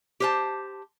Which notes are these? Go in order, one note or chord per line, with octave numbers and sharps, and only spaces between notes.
G4 C5 A5